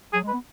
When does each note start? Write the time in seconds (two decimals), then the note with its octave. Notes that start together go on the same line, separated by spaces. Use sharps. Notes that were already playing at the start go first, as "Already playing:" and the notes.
0.13 F#3 G#4
0.23 G#3 B4
0.33 B3